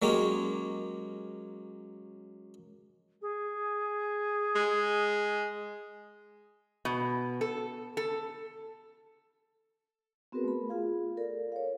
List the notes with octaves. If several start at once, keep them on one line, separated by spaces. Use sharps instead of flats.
F#3 G#3 A#3 C#4 G4
G#4
G#3
B2
A4
A4
B3 C4 F#4 G#4 A#4 B4
A3 B5
F4 G#4 F5
A4 A#4 D5
C#5 F5